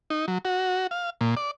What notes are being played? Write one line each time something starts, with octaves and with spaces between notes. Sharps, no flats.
D#4
F#3
F#4
F5
A#2
D5